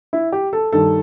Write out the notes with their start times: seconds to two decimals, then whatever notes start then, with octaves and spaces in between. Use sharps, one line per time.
0.13 E4
0.32 G4
0.53 A4
0.72 G2 D#3 A4